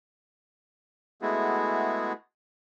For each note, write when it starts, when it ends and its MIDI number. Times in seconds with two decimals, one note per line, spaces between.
1.22 2.13 56
1.22 2.13 57
1.22 2.13 59
1.22 2.13 64
1.22 2.13 66
1.22 2.13 68